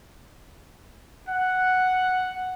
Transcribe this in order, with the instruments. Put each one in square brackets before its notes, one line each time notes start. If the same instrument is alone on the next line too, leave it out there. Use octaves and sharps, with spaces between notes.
[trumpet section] F#5